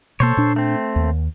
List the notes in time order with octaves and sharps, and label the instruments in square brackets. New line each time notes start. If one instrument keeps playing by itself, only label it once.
[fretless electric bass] B2 A#3 [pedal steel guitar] A4 C5 C#5
[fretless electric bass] A#2 D4
[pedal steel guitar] A3 C4
[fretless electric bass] D#2